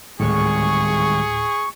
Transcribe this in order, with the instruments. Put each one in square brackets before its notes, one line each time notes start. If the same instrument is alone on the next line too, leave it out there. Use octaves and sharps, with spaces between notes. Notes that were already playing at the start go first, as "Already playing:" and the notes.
[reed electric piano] D2 A2 [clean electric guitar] D#3 G3 G#3 [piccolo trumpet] G#4 [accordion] C#6